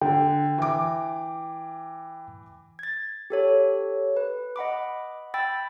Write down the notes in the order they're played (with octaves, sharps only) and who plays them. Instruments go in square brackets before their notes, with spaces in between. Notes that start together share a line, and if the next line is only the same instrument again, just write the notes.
[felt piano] D3 [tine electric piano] G5
[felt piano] E3 D6
[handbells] G#6 A6
G4 A4 C#5
B4
D#5 F#5 B5 D6
G5 B5 E6 A6